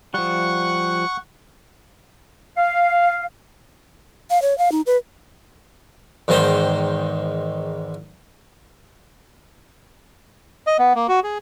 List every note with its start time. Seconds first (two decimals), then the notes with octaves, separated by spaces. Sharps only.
0.14 F3 G3 F#5 C#6 F#6
2.57 F5
4.30 F5
4.42 C#5
4.58 F5
4.72 D#4
4.86 B4
6.28 E2 G#2 D#3 C5 G5
10.67 D#5
10.79 B3
10.95 A#3
11.09 F#4
11.24 G#4